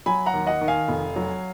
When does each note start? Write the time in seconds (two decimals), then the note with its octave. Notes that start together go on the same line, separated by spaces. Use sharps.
0.06 F#3 G#5 B5
0.26 F#5 A#5
0.34 D#2
0.47 D#5 F#5
0.61 D#3
0.68 F5 G#5
0.88 F1
1.16 F#3